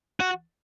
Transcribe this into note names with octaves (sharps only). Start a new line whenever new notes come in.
F#4